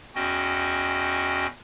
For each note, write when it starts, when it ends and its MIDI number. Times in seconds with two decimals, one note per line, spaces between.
0.15 1.47 40
0.15 1.47 61
0.15 1.47 66
0.15 1.47 75
0.15 1.47 79